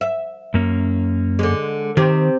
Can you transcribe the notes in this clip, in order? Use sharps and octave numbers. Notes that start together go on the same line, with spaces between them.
E5
F#2 A#3 C#4
D3 G#3
C3 D#3